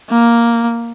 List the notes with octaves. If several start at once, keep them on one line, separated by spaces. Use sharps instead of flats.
A#3